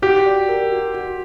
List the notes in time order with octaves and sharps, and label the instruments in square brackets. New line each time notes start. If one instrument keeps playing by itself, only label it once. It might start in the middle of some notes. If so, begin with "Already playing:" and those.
[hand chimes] F#4 [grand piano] G4
[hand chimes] D5
A#4
F#4
F#4